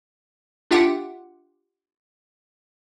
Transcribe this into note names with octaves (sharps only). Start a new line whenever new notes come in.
D4 F4 G4 E5 F#5 G5